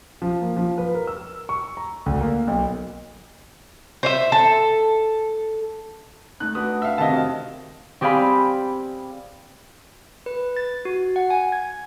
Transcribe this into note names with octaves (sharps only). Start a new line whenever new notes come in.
F3
A#3
F3
B4
A#4
E6
C#6
A#5
D2
A#3
B1
C5 C#5 E5
A4
A3 D#4 F#6
D4 F#4 B4 D#6
E5 F5
F2 C3 D#3 D#5 F5 A5
F#4
C4 G4 G#4 D5 F5 B5
B4
A6
F#4
F#5
G#5
G#6